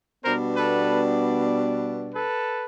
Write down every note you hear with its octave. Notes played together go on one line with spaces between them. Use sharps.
B2 G3 B3 D4 A#4 C5
A4 B4
A4 B4